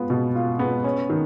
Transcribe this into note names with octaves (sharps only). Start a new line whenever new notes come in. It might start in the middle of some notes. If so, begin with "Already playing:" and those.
Already playing: G#3 B3 F4
B2
F4
B3
C#4
D#3